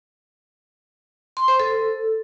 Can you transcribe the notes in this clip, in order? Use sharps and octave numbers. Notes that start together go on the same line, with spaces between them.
C6
C5
A4